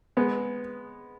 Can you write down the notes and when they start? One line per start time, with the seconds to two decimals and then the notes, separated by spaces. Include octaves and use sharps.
0.17 G#3 B3